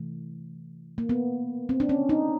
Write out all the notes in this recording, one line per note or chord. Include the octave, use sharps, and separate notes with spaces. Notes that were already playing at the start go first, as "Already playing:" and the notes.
Already playing: C3 E3 A3
A#3
B3
C4
D4
C#4
D#4